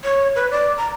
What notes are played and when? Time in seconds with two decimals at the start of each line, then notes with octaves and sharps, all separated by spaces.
0.04 C#5
0.36 B4
0.51 D5
0.78 A#5